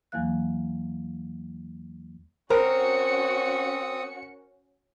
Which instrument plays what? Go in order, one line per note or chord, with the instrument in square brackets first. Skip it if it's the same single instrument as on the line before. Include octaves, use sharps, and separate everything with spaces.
[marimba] E2 E3 F#3 A#3 F5 F#6
[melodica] C4 D#6 [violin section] C#4 F#4 C#7 [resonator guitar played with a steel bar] A#4 [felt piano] C5